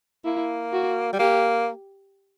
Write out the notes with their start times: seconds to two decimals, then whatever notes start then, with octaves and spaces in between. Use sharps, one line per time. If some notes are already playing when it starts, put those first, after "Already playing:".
0.25 A#3 E4
0.73 F#4
1.13 G3
1.19 A#3 G4